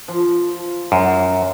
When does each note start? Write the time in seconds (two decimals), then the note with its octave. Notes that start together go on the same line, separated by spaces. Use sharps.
0.08 F3
0.92 F#2